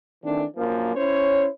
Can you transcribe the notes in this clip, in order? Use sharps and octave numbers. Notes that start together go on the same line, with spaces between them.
D#3 E3 A3 C4 D4
A#1 F#2 F3 A#3
C#4 E4 C5 C#5